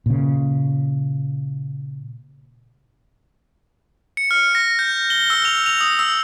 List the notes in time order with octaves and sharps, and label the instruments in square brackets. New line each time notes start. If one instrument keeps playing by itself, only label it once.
[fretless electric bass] A#2 C#3
[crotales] C#7
F6
A#6
G6
G7
E6
F7
F7
D#6
E6